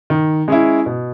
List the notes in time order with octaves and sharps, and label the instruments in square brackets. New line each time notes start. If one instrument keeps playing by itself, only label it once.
[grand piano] D#3
G#3 C#4 E4
B2